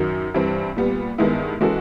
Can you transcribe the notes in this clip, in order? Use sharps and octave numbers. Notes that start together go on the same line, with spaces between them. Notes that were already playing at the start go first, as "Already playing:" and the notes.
Already playing: F#2 D#3 F#3
G2 E3 G3 C4
A#2 G3 B3
G2 D#3 G#3 B3 E4
E3 G#3 C#4 F#4 A4